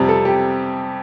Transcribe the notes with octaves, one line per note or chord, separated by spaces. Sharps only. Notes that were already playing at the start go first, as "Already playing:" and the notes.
Already playing: F2 C3 G3
A4
G4